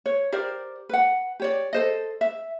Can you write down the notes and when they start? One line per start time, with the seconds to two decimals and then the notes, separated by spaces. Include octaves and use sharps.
0.06 C#5
0.32 G4 A#4 C5 D5
0.89 B4 F#5
1.40 G4 C#5 D5
1.73 A4 C5 D#5
2.21 E5